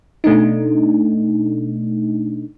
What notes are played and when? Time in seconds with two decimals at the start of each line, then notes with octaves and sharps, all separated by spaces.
0.24 B2 A3 D4 D#4